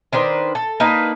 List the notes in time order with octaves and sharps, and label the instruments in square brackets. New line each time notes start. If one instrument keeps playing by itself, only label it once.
[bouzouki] D#3 D4 B4 C5
A4
A#3 D4 D#4 B4